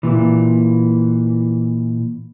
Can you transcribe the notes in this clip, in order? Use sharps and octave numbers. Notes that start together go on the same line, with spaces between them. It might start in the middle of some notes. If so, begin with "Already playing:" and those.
A#2 E3